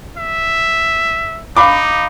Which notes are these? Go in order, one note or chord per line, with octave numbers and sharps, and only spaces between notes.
E5
D#4 F5 B5 D6